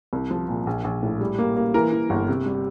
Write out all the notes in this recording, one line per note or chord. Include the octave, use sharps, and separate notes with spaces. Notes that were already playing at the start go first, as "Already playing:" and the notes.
C2
F3
A#2
A#1
A#1
A2
G3
A#3
A#3
E3 A#4
E3
G1
C3
G3